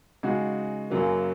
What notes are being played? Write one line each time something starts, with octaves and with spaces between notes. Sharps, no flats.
C#3 G#3 D#4 F#4
F#2 C#3 F#3 A#3